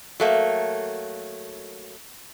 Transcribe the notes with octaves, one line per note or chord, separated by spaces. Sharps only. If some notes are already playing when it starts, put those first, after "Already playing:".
F#3 A3 A#3